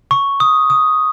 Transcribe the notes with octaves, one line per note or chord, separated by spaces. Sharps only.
C#6
D#6
D#6